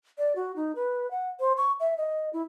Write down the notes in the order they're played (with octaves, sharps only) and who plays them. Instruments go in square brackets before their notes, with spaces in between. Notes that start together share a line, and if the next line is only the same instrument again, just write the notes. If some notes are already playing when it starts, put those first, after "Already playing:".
[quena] D5
F#4
D#4
B4
F#5
C5
C#6
E5
D#5
E4